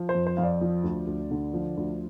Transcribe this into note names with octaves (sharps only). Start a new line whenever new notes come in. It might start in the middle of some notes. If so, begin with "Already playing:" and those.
Already playing: F3
C5
F2
C5
F2 F5
D5
F3
D2
D2
D3
F3
D2